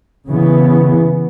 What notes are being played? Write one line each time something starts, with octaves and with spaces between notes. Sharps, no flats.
C#3 E3 B3